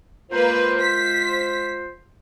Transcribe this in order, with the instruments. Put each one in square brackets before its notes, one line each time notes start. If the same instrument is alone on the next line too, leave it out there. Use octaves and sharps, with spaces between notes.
[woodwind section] G#3 F4 C5 [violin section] A#3 B4
[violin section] B6